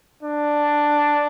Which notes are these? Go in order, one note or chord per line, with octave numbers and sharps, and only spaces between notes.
D4